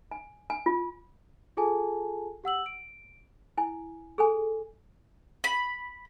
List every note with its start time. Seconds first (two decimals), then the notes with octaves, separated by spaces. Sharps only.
0.11 G#5
0.50 G#5
0.66 F4
1.57 F4 G#4 A4 G#5 A5
2.44 G4 F#5 E6 F#7
2.66 D7
3.57 E4 G#5
4.18 G#4 A4 G#5
5.44 B5